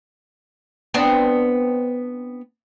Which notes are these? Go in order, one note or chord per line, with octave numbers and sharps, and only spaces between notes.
B3 C4 D4